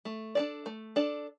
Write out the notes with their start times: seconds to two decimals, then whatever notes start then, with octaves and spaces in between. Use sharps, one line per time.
0.05 A3
0.35 D4 A4 D5
0.66 A3
0.96 D4 A4 D5